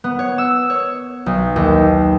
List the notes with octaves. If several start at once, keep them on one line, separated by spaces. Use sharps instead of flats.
B3
C#5
E6
C#5
B1
D#2